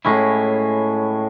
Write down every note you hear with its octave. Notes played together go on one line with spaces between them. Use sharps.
A2 G#3 C#4 E4